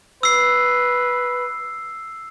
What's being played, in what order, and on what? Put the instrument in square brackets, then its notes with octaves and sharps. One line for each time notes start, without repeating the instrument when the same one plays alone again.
[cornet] B4 [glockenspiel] E6 C7